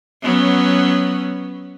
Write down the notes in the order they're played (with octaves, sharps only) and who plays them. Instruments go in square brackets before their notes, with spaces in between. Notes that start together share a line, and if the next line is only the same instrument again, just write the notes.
[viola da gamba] F#3 B3 C#4